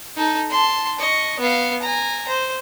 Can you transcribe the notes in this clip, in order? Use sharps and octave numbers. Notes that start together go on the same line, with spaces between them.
D#4 A4
A5 C6
D#5 C#6
B3 F5
G#5 A#5
C5